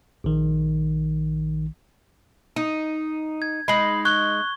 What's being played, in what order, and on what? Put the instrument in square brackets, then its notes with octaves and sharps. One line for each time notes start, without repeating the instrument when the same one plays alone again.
[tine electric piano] A#1 D#3
[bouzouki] D#4
[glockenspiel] G#6
[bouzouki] G#3 D#4 [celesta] B5 C7 F#7
[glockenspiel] C#6 G#6 G7 [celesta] F#6